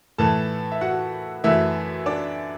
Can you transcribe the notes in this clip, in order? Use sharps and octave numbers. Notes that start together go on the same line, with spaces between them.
A2 E3 A3 A4 A5
E5
F#4 F#5
F#2 E3 A3 E4 E5
D4 D5